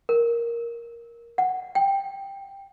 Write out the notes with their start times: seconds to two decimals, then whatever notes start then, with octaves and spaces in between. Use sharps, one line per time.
0.09 A#4
1.38 F#5
1.75 G5